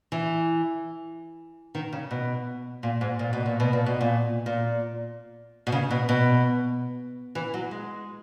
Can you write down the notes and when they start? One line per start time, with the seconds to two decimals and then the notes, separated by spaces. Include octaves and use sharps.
0.12 E3
1.75 D#3
1.93 C#3
2.11 B2
2.83 A#2
3.01 G#2
3.19 A#2
3.33 B2
3.46 A#2
3.60 B2
3.73 A#2
3.86 B2
4.01 A#2
4.46 A#2
5.67 B2
5.72 C#3
5.91 B2
6.09 B2
7.35 E3
7.54 F#3
7.71 G#3